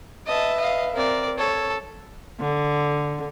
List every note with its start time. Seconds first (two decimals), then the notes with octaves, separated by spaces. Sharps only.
0.27 B4 D#5 E5 A5
0.57 D#5 F5
0.95 C4 A#4 D5
1.38 A4 C#5
2.40 D3